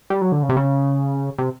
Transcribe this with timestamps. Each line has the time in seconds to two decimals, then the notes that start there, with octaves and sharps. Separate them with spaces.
0.10 G3
0.21 F#3
0.32 D3
0.43 C#3
0.49 C3
0.57 C#3
1.38 C3